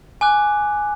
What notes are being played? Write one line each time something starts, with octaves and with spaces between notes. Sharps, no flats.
G#5 D6 F#6